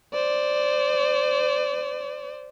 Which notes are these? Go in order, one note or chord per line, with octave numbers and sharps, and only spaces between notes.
C5 D5